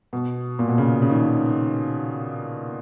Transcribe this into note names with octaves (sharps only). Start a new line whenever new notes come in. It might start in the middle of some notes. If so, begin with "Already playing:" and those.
B2
A#2
B2
C#3
C#3
D#3